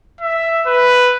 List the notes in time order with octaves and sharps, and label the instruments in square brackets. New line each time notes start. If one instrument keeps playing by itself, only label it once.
[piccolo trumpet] E5
B4